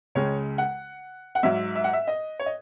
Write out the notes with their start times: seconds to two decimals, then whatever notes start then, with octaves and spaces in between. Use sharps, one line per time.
0.15 C#2 C#3 G#3 C#5
0.58 F#5
1.35 F#5
1.43 G#2 F#3 E5
1.76 E5
1.84 F#5
1.93 E5
2.07 D#5
2.39 C#5
2.46 D#5